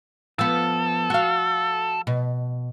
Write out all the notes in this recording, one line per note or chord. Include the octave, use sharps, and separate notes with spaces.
F3 B3 A4
F#4 F5
B2